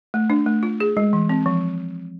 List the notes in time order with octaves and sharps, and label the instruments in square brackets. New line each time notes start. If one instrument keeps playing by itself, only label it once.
[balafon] A3
D4
A3
F4
G#4
G#3
E3
C4
F3